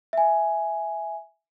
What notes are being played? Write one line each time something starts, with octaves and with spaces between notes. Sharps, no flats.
E5 G#5